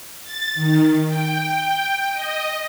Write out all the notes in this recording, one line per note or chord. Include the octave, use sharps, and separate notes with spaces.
A6
D#3
G5
D#5